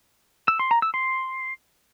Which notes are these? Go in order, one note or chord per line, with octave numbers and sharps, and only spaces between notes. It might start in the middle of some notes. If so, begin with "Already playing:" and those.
E6
C6
A#5
E6
C6